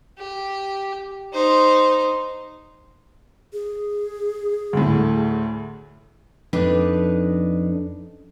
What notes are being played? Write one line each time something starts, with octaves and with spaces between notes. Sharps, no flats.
G4
D#4 C5
G#4
D2 A2
F2 D4 D#4 B4